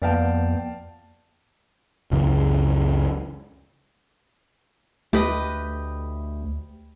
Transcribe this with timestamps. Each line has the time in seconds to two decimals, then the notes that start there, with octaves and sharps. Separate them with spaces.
0.02 F2 A#3 B3 D5 F5 G5 A5
2.11 F#1 C#2 C#3 E3
5.13 D2 A3 G4 B4 D#5